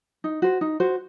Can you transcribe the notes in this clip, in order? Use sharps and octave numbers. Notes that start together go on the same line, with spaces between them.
D#4
F#4 C5
D#4
F#4 C5